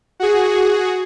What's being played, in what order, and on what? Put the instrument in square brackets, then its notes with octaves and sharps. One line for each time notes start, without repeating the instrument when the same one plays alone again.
[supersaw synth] F#4 G#4